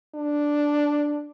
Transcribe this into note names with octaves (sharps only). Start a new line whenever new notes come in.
D4